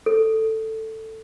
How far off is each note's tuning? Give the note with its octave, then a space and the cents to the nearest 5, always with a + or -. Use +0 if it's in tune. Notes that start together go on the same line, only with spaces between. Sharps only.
A4 +10